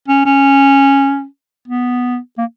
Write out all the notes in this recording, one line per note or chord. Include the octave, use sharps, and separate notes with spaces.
C#4
C#4
B3
A#3